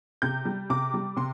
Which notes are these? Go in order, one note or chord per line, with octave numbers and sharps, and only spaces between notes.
C3 G6
G3
C3 D6
G3
C3 C6